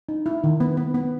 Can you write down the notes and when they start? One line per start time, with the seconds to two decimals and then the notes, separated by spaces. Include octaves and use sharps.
0.09 D#4
0.26 E4
0.44 D#3
0.60 B3
0.77 B3
0.94 B3